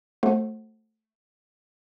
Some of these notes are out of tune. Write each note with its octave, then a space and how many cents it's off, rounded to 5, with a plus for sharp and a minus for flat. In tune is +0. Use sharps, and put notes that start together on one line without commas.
A3 +0 F#4 +0 C5 +30